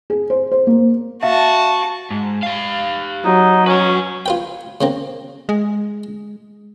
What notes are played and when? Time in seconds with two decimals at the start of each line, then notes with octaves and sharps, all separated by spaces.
0.10 G#4
0.30 C5
0.52 C5
0.67 A#3
1.23 F#4 E5 F5 A5
2.11 G#2
2.43 G4 F5
3.25 F#3 D#4
3.67 C#4 B4 G5
4.26 F4 B4 G5
4.81 C#3 A#3 C4
5.49 G#3